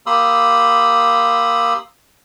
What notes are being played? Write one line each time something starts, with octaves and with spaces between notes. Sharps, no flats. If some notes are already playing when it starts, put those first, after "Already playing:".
A#3 G4 B5 C6 D#6 E6